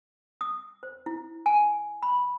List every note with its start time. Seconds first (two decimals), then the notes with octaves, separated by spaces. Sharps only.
0.41 D#6
0.83 C5
1.06 E4
1.46 G#5
2.03 B5